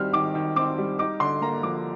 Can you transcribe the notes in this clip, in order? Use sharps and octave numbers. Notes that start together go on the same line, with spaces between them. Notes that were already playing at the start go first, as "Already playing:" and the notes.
Already playing: D#3 G3 C4 F6
D#3 D6
D#3
C4 D6
G3
D#4 D6
D3 C6
A#3 A#5
F3 D6